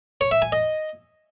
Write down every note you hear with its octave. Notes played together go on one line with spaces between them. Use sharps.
C#5
E5
G#5
D#5